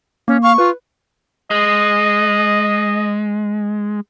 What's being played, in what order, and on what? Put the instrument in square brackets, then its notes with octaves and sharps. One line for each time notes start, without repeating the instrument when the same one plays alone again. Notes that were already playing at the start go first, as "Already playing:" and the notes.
[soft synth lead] A#3 [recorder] C#4
[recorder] F5 [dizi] C#6
[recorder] F4 [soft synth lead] B4
[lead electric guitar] G#3 [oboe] D#5